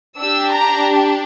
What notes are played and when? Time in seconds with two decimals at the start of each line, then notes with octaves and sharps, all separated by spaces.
0.19 D4 G4 E6
0.53 A#5